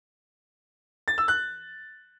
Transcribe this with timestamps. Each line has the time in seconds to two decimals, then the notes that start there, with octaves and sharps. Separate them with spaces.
1.08 A6
1.18 E6
1.28 F#6